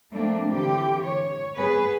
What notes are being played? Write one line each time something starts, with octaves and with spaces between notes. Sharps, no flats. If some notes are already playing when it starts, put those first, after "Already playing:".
F3 A3 A#3 C4 D4
D3 E3 G4
C#5
B3 G#4 B4